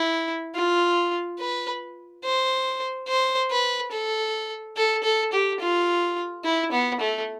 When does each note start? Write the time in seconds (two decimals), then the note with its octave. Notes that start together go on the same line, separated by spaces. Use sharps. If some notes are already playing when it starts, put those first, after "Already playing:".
Already playing: E4
0.55 F4
1.39 B4
2.24 C5
3.08 C5
3.50 B4
3.92 A4
4.77 A4
5.04 A4
5.33 G4
5.60 F4
6.44 E4
6.72 B3
7.01 A3